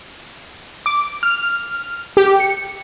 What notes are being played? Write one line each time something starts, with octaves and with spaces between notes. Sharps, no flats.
D6
F6
G4
C#7